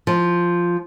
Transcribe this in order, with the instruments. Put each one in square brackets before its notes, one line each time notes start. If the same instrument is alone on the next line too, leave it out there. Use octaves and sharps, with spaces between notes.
[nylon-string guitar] F3